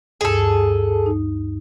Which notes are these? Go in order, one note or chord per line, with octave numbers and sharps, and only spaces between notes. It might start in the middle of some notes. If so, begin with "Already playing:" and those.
D2 G2 G#4 A4
D#4